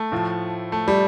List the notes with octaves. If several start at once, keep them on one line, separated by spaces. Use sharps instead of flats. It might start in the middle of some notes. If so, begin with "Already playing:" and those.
Already playing: A3
A2 F3
A3
G3